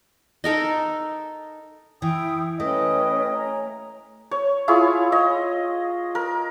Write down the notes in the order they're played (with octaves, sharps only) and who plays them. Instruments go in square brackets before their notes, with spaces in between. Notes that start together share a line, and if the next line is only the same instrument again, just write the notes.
[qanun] D#4 A4 A#4 D#5
[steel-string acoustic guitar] E3 [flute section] E4 G5 D#6
[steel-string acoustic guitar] A3 [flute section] C#4 B4 G5 [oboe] D#5
[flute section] C#5 G#5 A#5
[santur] C#5
E4 F4 G#4 C#5
D#5
A#4